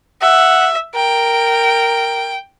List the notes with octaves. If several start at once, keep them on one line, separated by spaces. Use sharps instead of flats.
E5 F#5
A#4 G5